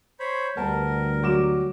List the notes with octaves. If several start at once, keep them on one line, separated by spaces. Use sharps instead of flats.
C5 C#5 B5
D2 G3 B3 A#4 A5
F#3 D6 E7